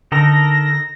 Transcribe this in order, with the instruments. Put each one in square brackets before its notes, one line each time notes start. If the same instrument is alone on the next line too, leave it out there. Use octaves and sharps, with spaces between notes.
[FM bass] D3 [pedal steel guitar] D#4 A4 A#4 [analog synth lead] A#6